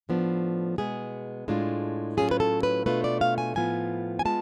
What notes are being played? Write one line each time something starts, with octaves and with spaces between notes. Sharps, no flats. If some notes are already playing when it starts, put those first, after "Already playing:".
A2 F3 B3 D4
B2 G#3 B3 G#4
A2 G#3 D4 F4
A2 F#3 C#4 F4 G#4
B4
A4
B4
B2 A3 D4 F4 B4
D5
F5
G#5
A2 F3 B3 F4 G#5
G#5
G#3 B3 F4 A5